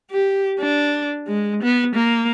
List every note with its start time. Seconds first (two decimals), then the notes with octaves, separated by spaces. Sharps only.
0.11 G4
0.59 D4
1.27 G#3
1.62 B3
1.95 A#3